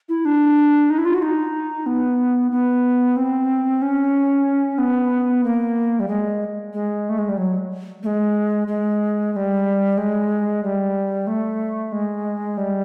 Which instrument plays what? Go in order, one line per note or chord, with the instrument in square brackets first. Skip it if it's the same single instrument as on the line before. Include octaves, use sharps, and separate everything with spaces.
[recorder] E4
D4
D#4
E4
F4
F#4
D#4
B3
B3
C4
C#4
B3
A#3
G3
G#3
G#3
A3
G#3
G3
F#3
A3
G#3
G#3
G#3
G3
G#3
G3
A3
G#3
G3